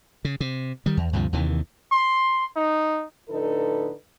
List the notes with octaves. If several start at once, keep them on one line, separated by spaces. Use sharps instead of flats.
C#3
C3
D#3 G3
E2
D2 G2 C3 F3
D#2 C3 D#3 E3
C6
D#4
A2 D3 F3 D#4 A4 B4